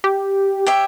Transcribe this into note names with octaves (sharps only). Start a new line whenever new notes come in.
G4
G4 C#5 E5